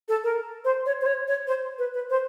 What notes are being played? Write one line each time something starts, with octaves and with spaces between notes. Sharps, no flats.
A4
A#4
C5
C#5
C5
C#5
C#5
C5
B4
B4
C5